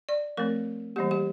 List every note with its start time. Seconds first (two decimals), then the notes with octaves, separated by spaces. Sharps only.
0.09 D5
0.37 F3 A3 C4 A#4
0.96 E3 G3 A#3 G4
1.11 G4